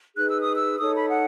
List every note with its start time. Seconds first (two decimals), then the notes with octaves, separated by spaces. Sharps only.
0.14 D#4 G#4 B4 F#6
0.27 E6
0.41 D#6
0.54 E6
0.78 D#4 A4 C#5 D#6
0.95 B5
1.10 F#5